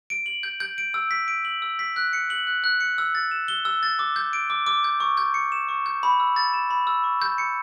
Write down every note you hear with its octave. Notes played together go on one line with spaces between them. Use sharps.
D7
F#7
G6
G6
D7
E6
B6
D7
F#7
E6
B6
F#6
C#7
F#7
F#6
F#6
C#7
E6
A6
E7
G7
E6
A6
D6
G6
D7
D6
D6
G6
C#6
G6
C#7
E7
C#6
G6
B5
E6
A6
E7
B5
E6
C#6
G6
C#7